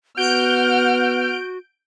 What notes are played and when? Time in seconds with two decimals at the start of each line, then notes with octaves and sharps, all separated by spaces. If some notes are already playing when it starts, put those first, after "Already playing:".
0.17 B3 F#4 F#5 F6 G6 D7